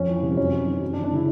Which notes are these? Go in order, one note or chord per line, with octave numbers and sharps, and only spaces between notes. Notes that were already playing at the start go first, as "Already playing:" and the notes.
Already playing: F2 C#4
E3
C3
F#2 C#4
F#2
D#3
F#2
D4
E3
D4
C#3 E4